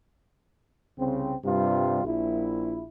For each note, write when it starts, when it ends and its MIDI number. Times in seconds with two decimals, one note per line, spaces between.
0.98 1.36 36
0.98 1.36 49
0.98 1.36 60
1.44 2.04 43
1.44 2.04 48
1.44 2.04 55
1.44 2.04 65
2.04 2.86 34
2.04 2.86 64